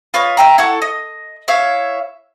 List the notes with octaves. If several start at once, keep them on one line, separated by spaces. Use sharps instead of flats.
F4 B4 C#5 D#5
E5 G5 A#5
E4 A4 F#5 C#6
D#5
E4 C#5 E5 F5